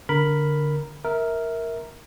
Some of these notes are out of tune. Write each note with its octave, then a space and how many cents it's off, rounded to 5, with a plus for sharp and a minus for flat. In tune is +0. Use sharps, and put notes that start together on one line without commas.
D3 -10 A#4 +0 B5 +0
A#4 +0 E5 -20